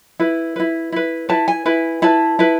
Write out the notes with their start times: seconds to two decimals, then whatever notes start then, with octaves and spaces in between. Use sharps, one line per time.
0.19 E4 B4
0.56 E4 B4
0.92 E4 B4
1.29 E4 B4 A5
1.48 G#5
1.66 E4 B4
2.02 E4 B4 A5
2.39 E4 B4